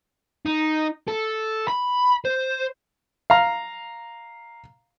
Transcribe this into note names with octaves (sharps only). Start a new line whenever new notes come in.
D#4
A4
B5
C5
F5 A#5